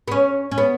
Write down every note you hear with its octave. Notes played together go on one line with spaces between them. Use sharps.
B3
C#4
C#4
B3